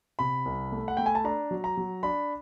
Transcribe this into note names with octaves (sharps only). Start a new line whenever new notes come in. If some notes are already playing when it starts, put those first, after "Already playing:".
C3 B5
C2
A3
F#5
A3 G5
G#5
A5
D4 A#5
F#3
A#5
F#3
D4 B5